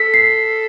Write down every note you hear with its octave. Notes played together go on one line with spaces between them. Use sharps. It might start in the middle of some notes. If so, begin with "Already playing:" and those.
Already playing: A4 B6
C7